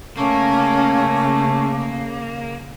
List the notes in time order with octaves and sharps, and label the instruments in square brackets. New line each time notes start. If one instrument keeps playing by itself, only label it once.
[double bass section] C#3 [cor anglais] A3 [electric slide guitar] A#3 [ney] C#4